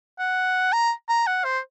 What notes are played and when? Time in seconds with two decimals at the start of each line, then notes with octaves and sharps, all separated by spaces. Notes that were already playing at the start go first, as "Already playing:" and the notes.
0.19 F#5
0.72 A#5
1.09 A#5
1.27 F#5
1.44 C5